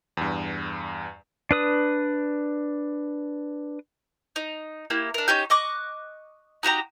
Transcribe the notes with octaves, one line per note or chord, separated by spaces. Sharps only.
E2 G2
D4 B4 D#6
D#4
A#3 E4 G4
D4 A#4
C#4 D#4 G4 G6
D#5 C#6 D6 F#6
D#4 F#4 G4 A#5